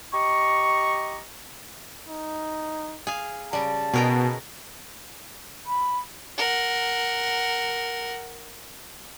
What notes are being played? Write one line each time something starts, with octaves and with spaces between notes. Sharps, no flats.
G4 D#5 A#5 C#6
D#4
G#4 F5
C#3 G3 A5
B2 G#4 A#4 G5
B5
A#4 F#5